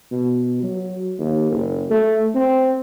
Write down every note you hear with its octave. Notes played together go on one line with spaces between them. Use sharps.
B2
F#3
D#2
F#1
A3
C4